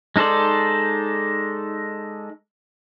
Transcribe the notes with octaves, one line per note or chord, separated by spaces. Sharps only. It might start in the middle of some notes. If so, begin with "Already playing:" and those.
G#3 D#4 A4 C5 D5